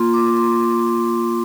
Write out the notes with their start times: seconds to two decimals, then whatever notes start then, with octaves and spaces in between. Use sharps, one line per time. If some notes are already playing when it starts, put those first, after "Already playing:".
Already playing: A#3 F4 C6
0.14 D6
0.37 C6